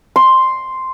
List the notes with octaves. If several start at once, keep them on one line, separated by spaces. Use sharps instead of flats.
C6